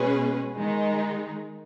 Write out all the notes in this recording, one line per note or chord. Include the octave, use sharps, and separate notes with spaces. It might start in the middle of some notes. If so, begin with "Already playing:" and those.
Already playing: B2 G#3 C#4 G#4 B4
D#3 G#3 D#4